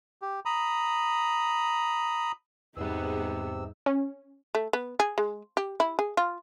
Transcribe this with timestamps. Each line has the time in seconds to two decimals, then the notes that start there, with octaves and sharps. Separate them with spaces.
0.22 G4
0.45 A#5 B5 D#6
2.77 E2 G#2 C3 G3 B3 D#4 G#4 E6
3.86 C#4
4.55 A3
4.73 B3
5.00 G#4
5.18 G#3
5.57 G4
5.80 E4
5.99 G#4
6.17 F4